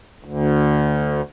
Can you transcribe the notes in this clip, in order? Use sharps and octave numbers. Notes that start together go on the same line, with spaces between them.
D2